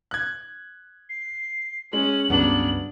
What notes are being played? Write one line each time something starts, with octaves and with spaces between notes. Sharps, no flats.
F#6 G#6
C7
G#3 C#4 F#7
C#2 G2 C#3 F#3 G3 B3 D4